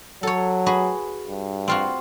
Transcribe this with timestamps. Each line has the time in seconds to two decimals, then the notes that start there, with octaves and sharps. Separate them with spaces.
0.23 F#3 A4 C#5
0.66 F#4 G#4 B4
1.28 G2
1.68 C4 F4 F#4